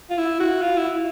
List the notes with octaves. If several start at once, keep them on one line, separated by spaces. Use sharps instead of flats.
F4
E4
F#4
F4
E4